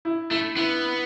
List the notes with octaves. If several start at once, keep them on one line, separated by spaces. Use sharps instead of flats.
E4
A3 E4
B3 E4